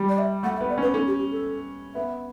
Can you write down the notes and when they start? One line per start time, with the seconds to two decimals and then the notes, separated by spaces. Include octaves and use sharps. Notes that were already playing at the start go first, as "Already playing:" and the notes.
Already playing: G3
0.09 D5
0.19 E5
0.43 A3 F#5
0.56 E5
0.61 B3
0.69 D5
0.78 C#4 B4
0.94 C#4 A4
1.07 G4
1.19 G4
1.32 A4
1.95 B3 E5